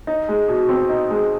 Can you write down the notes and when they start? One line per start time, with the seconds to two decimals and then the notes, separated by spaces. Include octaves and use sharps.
0.07 D#4
0.29 G#3
0.48 B2
0.69 C4
0.89 D#4
1.11 G#3